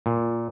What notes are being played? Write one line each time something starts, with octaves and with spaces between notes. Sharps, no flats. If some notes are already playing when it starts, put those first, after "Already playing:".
A#2